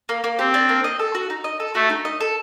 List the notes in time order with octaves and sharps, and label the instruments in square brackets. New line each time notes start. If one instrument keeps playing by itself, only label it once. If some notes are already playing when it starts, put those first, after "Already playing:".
[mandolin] A#3
A#3
[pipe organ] C4 [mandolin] G4
[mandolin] D4
A#3
D#5
A4
F#4
D#4
D#5
A4
[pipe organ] A3 [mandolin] F#4
[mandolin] D#4
D#5
A4